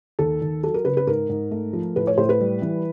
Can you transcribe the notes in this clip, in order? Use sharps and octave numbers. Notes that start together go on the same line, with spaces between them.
D#2 A4
D#2
F#3 A4
A#4
C#3 B4
B4
G#2 A#4
G#2
A3
F3
A2 B4
C#5
A2 C5
B4
G3
E3